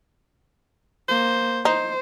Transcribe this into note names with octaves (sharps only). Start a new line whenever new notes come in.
A#3 C5
D#4 C5